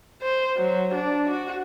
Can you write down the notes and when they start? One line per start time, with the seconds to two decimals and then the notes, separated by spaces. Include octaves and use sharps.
0.22 C5
0.57 F#3
0.94 D4
1.29 F#4